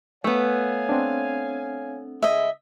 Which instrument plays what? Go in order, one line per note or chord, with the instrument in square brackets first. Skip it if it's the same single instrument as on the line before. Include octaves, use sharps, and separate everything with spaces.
[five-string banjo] A3 B3 [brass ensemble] C#5 F5 G#5
[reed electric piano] C4 D4
[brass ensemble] C#3 G#3 E4 [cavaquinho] D#5 E5